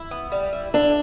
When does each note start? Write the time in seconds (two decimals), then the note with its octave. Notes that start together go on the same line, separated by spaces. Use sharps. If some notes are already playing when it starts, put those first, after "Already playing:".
Already playing: E4
0.11 B3
0.32 G3
0.53 E4
0.74 D3 D4